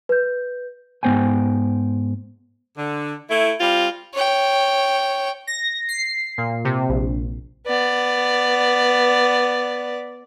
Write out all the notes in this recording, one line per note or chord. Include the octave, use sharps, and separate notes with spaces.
B4 G6
G#2 B3 C5 G5 G#5
D3
A3 E4
G3 C4 F4
C#5 G5
A#6
C7
A#2
C3
A#1
B3 D5